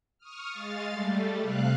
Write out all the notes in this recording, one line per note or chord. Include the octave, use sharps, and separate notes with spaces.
C#6 D#6 F6
G#3 F5 A6
G3 A3
C3 F5 F#6